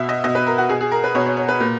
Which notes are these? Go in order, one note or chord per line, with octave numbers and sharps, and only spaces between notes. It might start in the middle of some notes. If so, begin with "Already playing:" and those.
Already playing: B2 E5
D#5
B2 D#5
B4
A#4
F#4
B2 G#4
G#4
A#4
B4
B2 C#5
C#5
C#5
B4
A#2